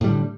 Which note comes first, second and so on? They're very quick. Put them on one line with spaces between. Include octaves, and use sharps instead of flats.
A2 G3 D3